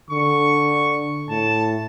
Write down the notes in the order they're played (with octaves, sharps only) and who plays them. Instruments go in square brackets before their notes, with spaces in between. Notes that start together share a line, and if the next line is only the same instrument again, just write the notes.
[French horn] D3 [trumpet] C#6
[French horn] A2 [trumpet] A5